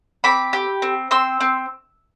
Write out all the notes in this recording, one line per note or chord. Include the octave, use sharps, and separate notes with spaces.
C4 B5 D6
G4
C4
C4 C6 E6
C4